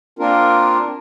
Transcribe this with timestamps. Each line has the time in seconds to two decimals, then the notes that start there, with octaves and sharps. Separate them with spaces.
0.19 A#3 C4 D4 F4 A#4